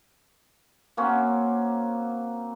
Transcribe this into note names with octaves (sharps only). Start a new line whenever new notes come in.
A#3 C4 C#4 F#4